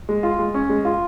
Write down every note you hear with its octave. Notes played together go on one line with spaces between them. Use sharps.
G#3
F4
G#3
C#4
G#3
F4